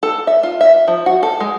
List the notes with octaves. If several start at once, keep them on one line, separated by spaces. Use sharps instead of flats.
A4
E5
F4
E5
F3
F#4
A4
G#3